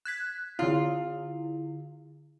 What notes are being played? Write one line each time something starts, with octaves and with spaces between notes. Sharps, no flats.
F#6 G#6 B6
D3 E4 F4